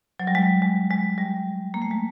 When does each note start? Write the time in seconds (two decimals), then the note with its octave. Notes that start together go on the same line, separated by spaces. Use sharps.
0.20 F#3
0.27 G3
0.35 G#3
0.62 G#3
0.91 G#3
1.18 G3
1.74 A#3
1.82 A3
1.91 G#3